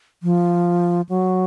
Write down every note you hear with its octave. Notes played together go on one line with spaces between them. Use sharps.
F3
F#3